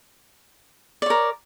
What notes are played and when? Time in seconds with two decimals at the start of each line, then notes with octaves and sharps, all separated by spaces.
1.02 D5
1.06 C#5
1.10 A#4